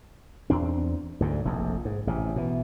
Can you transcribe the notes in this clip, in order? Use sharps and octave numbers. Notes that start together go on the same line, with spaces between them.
E2 C4 D4
D2 G#2 D3
F1 A#1 F2
G#2
A1 C3
B2 E3